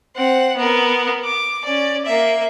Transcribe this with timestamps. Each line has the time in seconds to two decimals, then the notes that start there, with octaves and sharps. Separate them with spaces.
0.16 C4 F#5
0.57 B3 A#4
1.25 D6
1.65 C#4 D5
2.06 A#3 E5